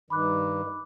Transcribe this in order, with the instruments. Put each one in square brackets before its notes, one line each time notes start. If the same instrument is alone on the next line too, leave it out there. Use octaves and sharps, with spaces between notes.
[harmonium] G2 D#3 [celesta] B5 D6 F#6